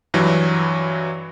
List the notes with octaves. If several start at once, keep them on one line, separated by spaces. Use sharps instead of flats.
G2 E3 F#3